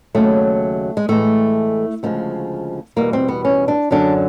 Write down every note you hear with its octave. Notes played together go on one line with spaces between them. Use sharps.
D#2 C#3 F#3 A3
G#3
A2 E3 G#3 A3
D2 C#3 F3 G#3 A3
E2 B2 G3 A#3
C4
B3
C#4
D4
F#2 D3 F#3 D4